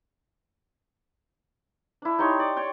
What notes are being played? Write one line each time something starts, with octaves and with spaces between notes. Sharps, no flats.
D4 E4
D#4 G4 C#5 C6
D5
C#5 D5 G5 C#6